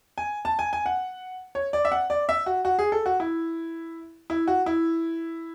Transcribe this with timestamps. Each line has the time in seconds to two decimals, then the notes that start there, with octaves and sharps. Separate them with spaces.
0.18 G#5
0.45 A5
0.59 G#5
0.73 G#5
0.86 F#5
1.55 C#5
1.73 D5
1.85 E5
1.92 F#5
2.10 D5
2.29 E5
2.46 F#4
2.65 F#4
2.79 G#4
2.92 A4
3.06 F#4
3.20 E4
4.30 E4
4.47 F#4
4.66 E4